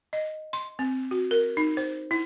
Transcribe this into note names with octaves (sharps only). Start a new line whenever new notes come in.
D#5
C6
C4
F#4
A#4
D#4
C5
E4